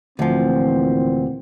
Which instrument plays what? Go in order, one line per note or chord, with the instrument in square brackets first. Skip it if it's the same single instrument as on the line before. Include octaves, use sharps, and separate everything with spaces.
[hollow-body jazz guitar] D2 F3 [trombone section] A#2 E3 C4